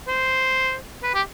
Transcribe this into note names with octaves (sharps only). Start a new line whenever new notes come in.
C5
B4
G4